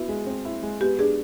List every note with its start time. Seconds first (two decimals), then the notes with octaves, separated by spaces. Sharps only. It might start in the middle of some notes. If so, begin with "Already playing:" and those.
Already playing: B3 E4 F#4
0.08 G#3
0.27 C4
0.45 E4
0.62 G#3
0.81 B3 G4
0.99 D4 G#4